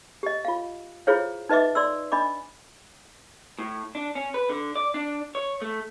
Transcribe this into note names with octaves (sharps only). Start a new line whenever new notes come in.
G4 D#5
F4 F5
E4 F4 G#4 C5 C#5 F5
D#4 B4 D#5 E5 D6
D5 C6 E6
D4 D#5 B5 D6
A2
D4
C#4
B4
D3
D5
D4
C#5
A3